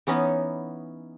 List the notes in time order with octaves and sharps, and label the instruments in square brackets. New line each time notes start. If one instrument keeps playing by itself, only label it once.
[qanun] E3 B3 C#4 D#4